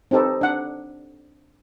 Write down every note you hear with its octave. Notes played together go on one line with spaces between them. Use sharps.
C4 D#4 G4 A4 B4
D4 F#5